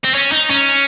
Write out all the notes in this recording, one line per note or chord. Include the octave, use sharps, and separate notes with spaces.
C4
C#4
D#4
C#4